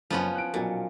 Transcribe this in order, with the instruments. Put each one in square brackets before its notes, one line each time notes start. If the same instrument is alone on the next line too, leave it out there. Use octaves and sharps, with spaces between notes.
[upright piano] F#1 [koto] F3 B3 C#4
[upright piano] F#6 D7
[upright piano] B1 F#4 [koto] A#2